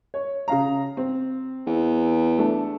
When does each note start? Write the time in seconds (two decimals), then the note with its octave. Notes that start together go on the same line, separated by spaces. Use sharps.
0.14 C#5
0.48 C#3 F5 A#5
0.97 C4
1.67 E2
2.38 A3 D4 A4